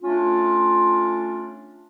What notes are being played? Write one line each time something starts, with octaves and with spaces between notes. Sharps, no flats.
A3 C#4 D4 F4